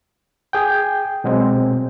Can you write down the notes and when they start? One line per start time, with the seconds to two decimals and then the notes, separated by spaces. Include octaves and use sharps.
0.53 G#4 G5
1.24 B2 F#3 G#3 C4